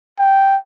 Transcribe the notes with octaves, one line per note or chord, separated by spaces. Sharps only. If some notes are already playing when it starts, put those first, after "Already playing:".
G5